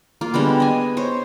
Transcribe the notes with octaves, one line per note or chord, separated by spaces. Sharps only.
A#3 F4
D3 G3 G#3 B3
D#5 G#5
C5 C#5